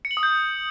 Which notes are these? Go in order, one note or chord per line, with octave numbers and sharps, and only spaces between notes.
C#7
F#7
D#6
G6